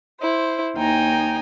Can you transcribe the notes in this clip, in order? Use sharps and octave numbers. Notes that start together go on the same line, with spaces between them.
E4 C5
D#2 D#4 G5 G#5 A#5